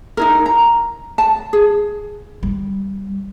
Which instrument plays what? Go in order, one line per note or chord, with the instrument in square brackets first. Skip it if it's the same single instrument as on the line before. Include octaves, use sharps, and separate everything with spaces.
[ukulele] D#4 E4 A#4
A#5
A5
G#4
[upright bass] G3